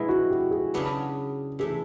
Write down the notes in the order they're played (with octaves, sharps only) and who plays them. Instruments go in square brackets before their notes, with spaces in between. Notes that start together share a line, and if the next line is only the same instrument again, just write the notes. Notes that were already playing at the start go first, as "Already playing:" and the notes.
Already playing: [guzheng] B2 G#3 B3 [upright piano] E4
[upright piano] F#4
G4
G#4
[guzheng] C#3 F#3 B3 D4
[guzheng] C3 E3 A3 [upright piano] G#4